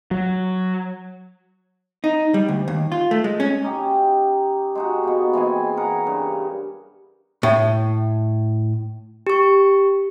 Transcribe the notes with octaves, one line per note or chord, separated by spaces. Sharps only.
F#3
D#4
G3
D2
D#2
F4
A3
G#3
C#4
C#4 D#4 G4
G#3 D#4 F#4
B2 A#3 B3
E3 G#3 C4 G#5
G#4 A#4 F#5
G2 C#3
A2
G4 C#6